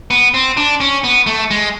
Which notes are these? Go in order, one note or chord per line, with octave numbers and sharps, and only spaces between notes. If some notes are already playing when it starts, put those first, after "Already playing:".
B3
C4
D4
C#4
B3
A3
G#3